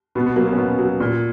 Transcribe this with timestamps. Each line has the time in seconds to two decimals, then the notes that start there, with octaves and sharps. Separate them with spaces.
0.15 B2 B3
0.26 B3
0.36 F#3 A#3
0.47 B3
0.53 C#4
0.58 B2 B3
0.79 F#3
1.00 A#2